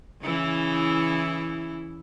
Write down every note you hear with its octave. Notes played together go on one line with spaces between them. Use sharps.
C#3 E3 E4